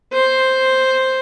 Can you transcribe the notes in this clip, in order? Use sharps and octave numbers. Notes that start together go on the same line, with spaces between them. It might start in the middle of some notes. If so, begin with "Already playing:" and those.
C5